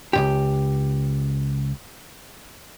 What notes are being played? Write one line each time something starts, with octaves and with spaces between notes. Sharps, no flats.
C#2 G#2 G4